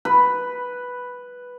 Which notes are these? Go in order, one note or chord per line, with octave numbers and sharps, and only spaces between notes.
B4